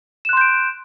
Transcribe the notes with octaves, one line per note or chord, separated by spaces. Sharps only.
C6 F#6 G6 D7 E7